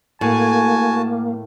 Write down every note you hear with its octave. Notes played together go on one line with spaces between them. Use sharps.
A2 A#3 F#4 G#5 A5